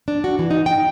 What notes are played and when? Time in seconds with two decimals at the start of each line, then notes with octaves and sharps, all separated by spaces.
0.08 D4
0.24 F#4
0.39 E3
0.51 D#4
0.66 G5